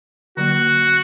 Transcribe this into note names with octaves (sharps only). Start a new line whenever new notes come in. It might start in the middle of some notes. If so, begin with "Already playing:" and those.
D3 F#3 A#3 F#4